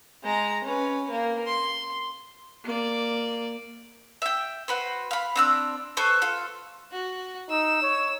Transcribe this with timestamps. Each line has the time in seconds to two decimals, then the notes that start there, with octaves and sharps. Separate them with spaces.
0.23 G#3 A#5
0.64 C#4 B4
1.10 A#3
1.46 C6
2.63 A#3 D5
4.22 E5 G5
4.68 F#4 B4 C5
5.11 F5 B5
5.36 C4 D4 E6
5.97 A4 B4 C5 C#6
6.22 F4 A4
6.92 F#4
7.50 D#4 E6
7.82 C#5